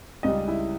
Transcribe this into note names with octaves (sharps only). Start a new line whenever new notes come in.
C#2 C#3 G3 D#5
E4